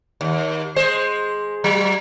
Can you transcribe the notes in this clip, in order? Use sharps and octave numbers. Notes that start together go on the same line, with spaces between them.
D#2
G#3 C5
F#3